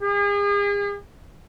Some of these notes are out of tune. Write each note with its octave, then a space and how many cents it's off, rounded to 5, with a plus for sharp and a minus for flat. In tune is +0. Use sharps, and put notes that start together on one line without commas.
G#4 -40